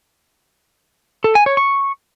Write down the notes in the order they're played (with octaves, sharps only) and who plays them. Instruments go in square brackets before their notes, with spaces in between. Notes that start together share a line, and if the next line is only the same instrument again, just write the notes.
[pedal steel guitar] A4
G#5
C#5
C#6